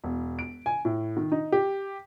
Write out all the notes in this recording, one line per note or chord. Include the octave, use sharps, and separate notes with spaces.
E1
D7
G#5
A2
D#3
D#4
G4